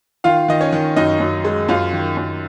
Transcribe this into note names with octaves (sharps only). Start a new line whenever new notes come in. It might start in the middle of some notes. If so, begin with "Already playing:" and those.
D#3 F4 F5
D#3 D#5
C#4 C#5
D#3
F#2 D#4 D#5
F#2
G#3
F#2 F4 F5
D#3
F#2